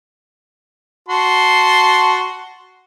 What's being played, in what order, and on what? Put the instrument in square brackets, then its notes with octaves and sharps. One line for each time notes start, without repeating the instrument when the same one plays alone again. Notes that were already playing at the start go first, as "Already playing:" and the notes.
[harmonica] F#4 A5 C6